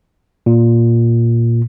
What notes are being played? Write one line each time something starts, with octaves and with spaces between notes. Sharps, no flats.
A#2